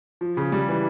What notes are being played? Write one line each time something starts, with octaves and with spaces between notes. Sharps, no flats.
F3
C#3
G3
E3